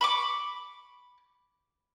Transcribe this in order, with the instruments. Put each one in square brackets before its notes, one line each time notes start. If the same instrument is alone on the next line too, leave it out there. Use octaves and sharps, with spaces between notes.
[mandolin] B5 C#6 D6